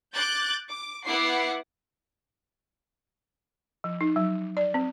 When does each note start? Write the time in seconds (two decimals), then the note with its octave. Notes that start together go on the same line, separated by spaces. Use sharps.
0.16 D6 F#6 G6 A6
0.71 D6
1.06 B3 E4 F#5 D6 C7
3.84 F3
4.01 D#4
4.16 F#3
4.57 D5
4.74 C4